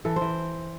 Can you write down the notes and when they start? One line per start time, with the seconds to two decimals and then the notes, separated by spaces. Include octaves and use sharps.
0.05 E3 A4
0.16 C5
0.21 E3